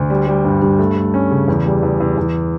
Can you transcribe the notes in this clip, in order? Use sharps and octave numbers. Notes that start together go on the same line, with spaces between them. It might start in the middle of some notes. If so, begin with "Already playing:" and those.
Already playing: D2
G3
G3
G2
G2
A3
A3
C#4
C#3
E2
G3
E2
E2
E2